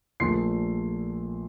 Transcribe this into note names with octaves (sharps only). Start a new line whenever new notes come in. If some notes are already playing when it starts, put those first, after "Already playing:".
A#1 A#2 A3 C6 C7